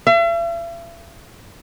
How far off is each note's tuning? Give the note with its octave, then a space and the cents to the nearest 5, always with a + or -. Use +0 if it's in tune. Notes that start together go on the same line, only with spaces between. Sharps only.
E5 +45